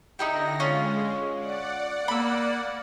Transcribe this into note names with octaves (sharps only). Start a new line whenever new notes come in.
D3 D#4 E4 G4 A#6
G#3 C#4 F4
D5 F#5
A#3 B5 E6